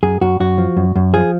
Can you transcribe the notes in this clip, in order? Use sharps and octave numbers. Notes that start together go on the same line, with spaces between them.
F#2 G#4
F#2 F#4
F#2 F#4
F3
F#2
F#2
F3 G#4